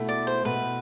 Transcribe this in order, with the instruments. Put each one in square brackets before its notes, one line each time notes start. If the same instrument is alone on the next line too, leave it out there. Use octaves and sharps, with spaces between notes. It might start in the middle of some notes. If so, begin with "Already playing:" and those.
Already playing: [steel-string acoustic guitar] B2 A3 E4
[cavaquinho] D5
C5
[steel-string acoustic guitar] B2 A3 E4 [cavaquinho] B4